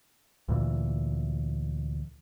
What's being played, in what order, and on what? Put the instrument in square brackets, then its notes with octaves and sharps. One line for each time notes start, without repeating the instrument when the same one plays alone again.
[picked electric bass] D2 A#2 E3